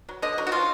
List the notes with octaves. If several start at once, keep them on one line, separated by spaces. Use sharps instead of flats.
F#3
D3 D#5
F#3
F#4
F3 F4